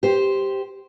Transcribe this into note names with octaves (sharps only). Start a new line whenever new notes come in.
G4 C5